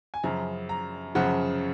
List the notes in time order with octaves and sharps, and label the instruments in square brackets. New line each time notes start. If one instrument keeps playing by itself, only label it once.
[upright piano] G#5
F#2 C#3 F3 A#5
A#5
F#2 C#3 F3 F#5